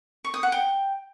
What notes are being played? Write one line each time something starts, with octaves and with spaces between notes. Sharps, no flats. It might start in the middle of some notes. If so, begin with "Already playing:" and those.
C#6
D#6
F#5
G5